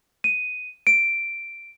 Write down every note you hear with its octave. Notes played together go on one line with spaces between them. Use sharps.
D#7
D7